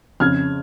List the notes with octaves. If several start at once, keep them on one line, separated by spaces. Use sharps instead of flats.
F2 C#3 F6 G#6